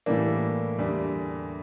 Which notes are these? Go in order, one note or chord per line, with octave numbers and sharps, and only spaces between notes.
A2 E3 G3 A#3 D4
E2 D3 G3